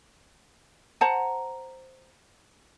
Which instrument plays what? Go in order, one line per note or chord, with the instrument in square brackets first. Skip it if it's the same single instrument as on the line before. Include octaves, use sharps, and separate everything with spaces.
[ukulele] C5 F#5 A5 A#5